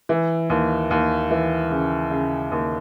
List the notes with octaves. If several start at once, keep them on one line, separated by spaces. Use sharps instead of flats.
E3
D#2
D#2
E3
C#3
C#3
D#2